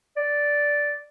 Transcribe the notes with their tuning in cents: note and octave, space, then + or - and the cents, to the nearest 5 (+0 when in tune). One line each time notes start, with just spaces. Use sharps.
D5 -5